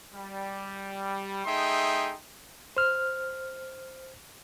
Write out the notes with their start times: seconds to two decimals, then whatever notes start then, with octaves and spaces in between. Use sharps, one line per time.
0.14 G3
1.45 A3 D#4 G#4 E5 G5 C6
2.77 C5 F6